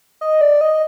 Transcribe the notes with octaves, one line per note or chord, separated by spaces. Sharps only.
D#5
D5
D#5